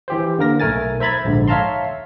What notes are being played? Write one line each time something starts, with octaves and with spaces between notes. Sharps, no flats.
E3 G4 C5
D3 A#3 A#4 A#6
B1 A3 A#4 G#5 A6
C5 E5 A#5 B5 G#6 A6
A#1 G#2 D3
C#5 E5 F5 A5 A#5 C6